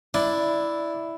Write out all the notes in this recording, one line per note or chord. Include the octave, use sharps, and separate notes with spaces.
D4 E4